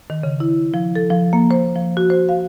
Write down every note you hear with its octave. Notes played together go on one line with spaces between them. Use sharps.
D#3
C#3
E4
F3
A4
F3
A#3
C5
F3
F#4
C5
F5